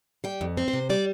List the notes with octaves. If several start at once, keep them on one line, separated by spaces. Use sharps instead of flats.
G3 G5
F2
C4
C5
C3
G3 D5